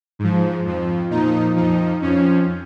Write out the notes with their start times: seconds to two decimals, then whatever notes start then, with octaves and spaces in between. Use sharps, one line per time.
0.19 G#2 F3
0.65 F2 F3
1.11 A#2 F3 D#4
1.56 F2 F3 D#4
2.02 F2 F3 C#4